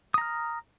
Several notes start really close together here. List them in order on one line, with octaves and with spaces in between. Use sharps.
D#6 A#5 F6